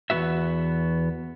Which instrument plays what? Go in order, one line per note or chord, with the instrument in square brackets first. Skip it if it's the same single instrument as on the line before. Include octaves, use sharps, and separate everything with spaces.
[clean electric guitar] E2 G2 B3 F#4 E5